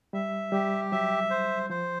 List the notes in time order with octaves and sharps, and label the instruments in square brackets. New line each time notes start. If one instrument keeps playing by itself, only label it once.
[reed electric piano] G3 [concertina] E5
[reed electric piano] G3 [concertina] G4
[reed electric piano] F#3 [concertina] E5
[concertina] C5
[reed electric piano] F3 [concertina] C5